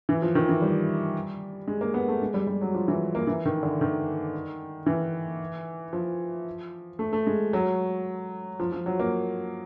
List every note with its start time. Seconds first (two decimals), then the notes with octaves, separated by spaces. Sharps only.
0.09 E3
0.22 F3
0.35 D#3
0.49 E3
0.62 G3
1.67 G#3
1.81 A#3
1.94 B3
2.08 A3
2.22 G#3
2.34 G3
2.47 G3
2.61 F#3
2.74 F3
2.88 E3
3.15 A#3
3.27 E3
3.45 D#3
3.63 D3
3.81 D#3
4.86 E3
5.93 F3
6.99 A3
7.13 A3
7.27 G#3
7.53 F#3
8.60 F3
8.72 F3
8.86 F#3
8.99 A#3